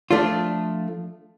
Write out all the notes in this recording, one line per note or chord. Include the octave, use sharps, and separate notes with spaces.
F3 A3 D4 F4